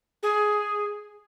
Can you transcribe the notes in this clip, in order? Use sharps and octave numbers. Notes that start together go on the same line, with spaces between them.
G#4